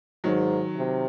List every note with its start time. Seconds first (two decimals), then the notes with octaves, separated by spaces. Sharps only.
0.24 G#2 D#3 F#3
0.76 C3